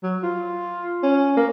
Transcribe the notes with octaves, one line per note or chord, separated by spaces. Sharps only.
F#3
F4
C#4
A#3